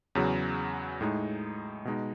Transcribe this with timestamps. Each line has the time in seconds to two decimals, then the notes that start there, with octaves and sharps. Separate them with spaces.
0.15 E2 C#3 F#3
1.01 A2 G#3 D#4
1.85 B2 G#3 D#4